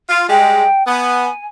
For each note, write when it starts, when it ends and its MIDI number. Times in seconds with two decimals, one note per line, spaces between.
0.08 0.27 65
0.29 0.65 55
0.29 0.65 56
0.29 0.85 79
0.87 1.28 59
0.87 1.46 80